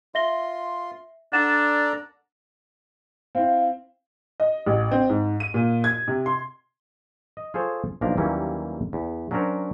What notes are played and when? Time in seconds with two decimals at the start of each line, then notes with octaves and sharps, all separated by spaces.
0.15 F4 E5 C6 A#6 G7
1.33 D4 A4 D5 F#5 A#5 A6 E7
3.35 C4 E4 F5
4.40 D#5
4.66 A1
4.91 C4
5.09 G#2
5.40 D#7
5.54 A#2
5.84 G#6
6.08 C3
6.26 C6
7.37 D#5
7.54 F4 G#4 A4 C5 C#5
8.01 B1 F3 A#3 D4 A#4
8.17 D#2 E3 F#3 G3 A#3 C#4
8.93 E2
9.31 F#3 C#4 D4 F#4 A#4 C5